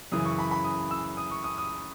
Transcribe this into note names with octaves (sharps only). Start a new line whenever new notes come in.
F#2 C#3 E3 D#6
C#6
B5
B5
D#6
E6
D#6
C#6
D#6
D#6